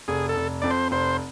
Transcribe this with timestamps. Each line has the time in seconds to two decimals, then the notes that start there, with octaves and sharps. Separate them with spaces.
0.08 F1 G#4
0.29 A4
0.36 F1
0.62 F2 D5
0.70 C5
0.91 F1 C5